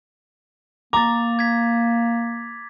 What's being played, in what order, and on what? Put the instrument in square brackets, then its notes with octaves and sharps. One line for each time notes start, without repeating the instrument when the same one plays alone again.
[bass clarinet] A#3 [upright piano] A#5 [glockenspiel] D6 A6
[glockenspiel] G#6 B6